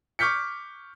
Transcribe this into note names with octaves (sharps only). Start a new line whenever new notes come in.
C#6 D6 F6 G6 B6 C#7